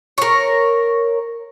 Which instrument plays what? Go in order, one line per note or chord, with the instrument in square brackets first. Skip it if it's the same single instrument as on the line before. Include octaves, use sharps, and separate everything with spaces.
[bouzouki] A#4 C#5